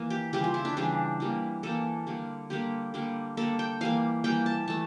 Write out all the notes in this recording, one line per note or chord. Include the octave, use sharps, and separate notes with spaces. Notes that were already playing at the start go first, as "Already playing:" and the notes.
Already playing: E3 A#3
G4
C#3 E3 G3 G4
F4
E4
D4
C#3 E3 G3 D4
E3 G3 A#3
E3 G3 A#3 A4
D3 G3 A#3
D3 G3 A#3 G4
D3 G3 A#3
D3 G3 A#3 A4
G5
E3 G3 A#3 F5
E3 G3 A#3 G5
A5
E3 A3 A5